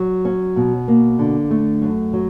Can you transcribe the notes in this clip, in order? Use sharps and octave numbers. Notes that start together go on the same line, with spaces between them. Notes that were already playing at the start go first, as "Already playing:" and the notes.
Already playing: F#3
C#4
B2
A#3
D3
A3
F#2
F#3